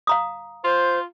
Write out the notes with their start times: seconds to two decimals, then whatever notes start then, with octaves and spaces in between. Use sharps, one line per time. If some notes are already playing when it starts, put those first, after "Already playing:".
0.07 F5 A#5 D#6
0.64 F4 C5